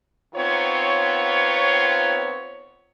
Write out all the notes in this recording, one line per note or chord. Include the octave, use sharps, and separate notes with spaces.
D#3 B3 C4 F4 C#5